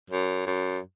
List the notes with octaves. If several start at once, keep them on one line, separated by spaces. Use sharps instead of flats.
F#2
F#2